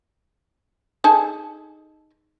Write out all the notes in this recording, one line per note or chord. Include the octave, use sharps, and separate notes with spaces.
D#4 G#4 A4